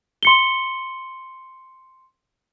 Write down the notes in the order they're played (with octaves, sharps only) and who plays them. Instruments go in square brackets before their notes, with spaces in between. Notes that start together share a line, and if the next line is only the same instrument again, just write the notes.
[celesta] C6 C#7 G7